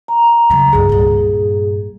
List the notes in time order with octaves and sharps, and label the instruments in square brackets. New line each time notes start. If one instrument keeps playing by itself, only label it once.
[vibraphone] A#5
[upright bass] C#3 F#3
[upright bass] C#2 G2 [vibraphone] G#4
[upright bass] G2 A#2